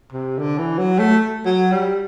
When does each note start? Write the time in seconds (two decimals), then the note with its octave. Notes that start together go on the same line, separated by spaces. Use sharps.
0.12 C3
0.39 D3
0.58 E3
0.78 F#3
0.99 A3
1.46 F#3
1.72 G3